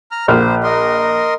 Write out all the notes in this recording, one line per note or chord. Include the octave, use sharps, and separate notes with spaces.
A#5 F6
A#1 C5 F6
A#4 D#5 C6